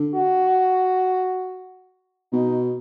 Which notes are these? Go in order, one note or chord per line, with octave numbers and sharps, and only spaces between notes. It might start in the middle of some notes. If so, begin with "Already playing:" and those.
Already playing: D3
F#4
B2 D#4